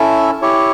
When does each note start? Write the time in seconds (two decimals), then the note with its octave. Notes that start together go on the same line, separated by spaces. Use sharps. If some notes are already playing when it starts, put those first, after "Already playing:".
Already playing: C#4 E4 A4 E5
0.42 E4 G4 C#5